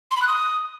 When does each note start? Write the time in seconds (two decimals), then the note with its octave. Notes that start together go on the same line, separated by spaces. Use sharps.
0.11 C6
0.16 B5
0.22 F#6
0.27 D#6